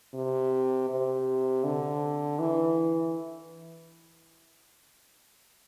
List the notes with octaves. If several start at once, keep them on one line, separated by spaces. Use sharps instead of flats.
C3
C3
D3
E3